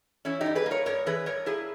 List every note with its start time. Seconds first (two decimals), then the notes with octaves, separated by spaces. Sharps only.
0.25 E3 C#4 E4
0.41 D#4 G4
0.46 G2
0.55 G#4 B4
0.66 A#3
0.71 A#4 C#5
0.86 G2 A#4 C#5
1.06 E3 G#4 B4
1.26 G2 A#4 C#5
1.46 A#3 E4 G#4